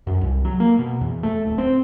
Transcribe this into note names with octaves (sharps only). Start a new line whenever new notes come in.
F#2
C2
F#3
A#3
B2
E2
A3
D1
C4